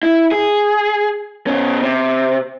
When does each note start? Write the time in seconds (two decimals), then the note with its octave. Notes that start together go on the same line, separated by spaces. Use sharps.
0.03 E4
0.32 G#4
1.47 B2 C#4
1.83 C3